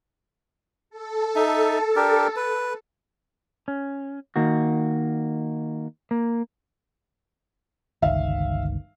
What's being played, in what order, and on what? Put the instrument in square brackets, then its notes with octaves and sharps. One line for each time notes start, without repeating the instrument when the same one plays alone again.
[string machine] A4
[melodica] D#4 E5
D4 G4 A#4
B4
[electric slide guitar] C#4
D#3 A#3 F#4
A#3
[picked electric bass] G1 C#2 D#3 [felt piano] E5 F5